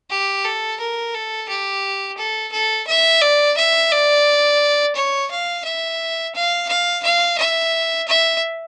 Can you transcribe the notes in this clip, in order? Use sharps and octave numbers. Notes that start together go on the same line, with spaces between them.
G4
A4
A#4
A4
G4
A4
A4
E5
D5
E5
D5
C#5
F5
E5
F5
F5
F5
E5
E5